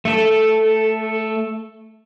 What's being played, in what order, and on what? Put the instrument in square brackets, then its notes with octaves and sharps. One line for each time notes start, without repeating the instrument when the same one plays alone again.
[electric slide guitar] A3 A4